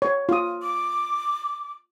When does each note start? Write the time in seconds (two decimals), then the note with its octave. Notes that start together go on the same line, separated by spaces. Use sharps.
0.02 C#5
0.29 F4 D#6
0.62 D6